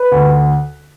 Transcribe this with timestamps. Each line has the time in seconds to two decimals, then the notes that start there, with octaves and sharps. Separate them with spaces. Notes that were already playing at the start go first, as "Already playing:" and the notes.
Already playing: B4
0.12 D2